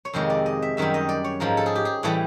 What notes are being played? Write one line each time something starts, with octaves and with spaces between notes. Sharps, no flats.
C#5
F2 C3 D#3 G#3 C5
D5
D#5
E5
F#2 D#3 G3 E5
D#5
D5
C#5
G#2 F3 G#3 A#4
A4
G#4
G4
G#4
A2 E3 G3 A4